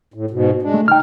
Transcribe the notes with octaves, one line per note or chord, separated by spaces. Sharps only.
A2
G#2 B2
G#3 D4
A3
D#4 G5 F6